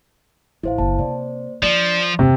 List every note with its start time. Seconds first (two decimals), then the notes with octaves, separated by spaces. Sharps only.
0.63 A1 E4 C5 F5
0.78 F#1 A5
0.99 C3 A#3 C5 D5
1.63 F3 D4 D5
2.19 E2 C3 D#3 G5